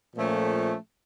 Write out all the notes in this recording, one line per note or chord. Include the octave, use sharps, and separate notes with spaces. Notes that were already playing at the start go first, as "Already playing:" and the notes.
A#2 F3 A3 C#4 A4